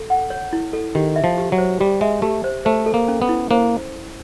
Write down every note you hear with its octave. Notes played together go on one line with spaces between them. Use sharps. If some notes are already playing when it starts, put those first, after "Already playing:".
Already playing: A4
F#5
C#5
E4
A4
D#3 G4
E5
F3
G4
F#3
C5
G3 G4
G#3 E5
A3 G4
C5
A3 C5
A4
A#3
C#4
B3
E4
A#3 C5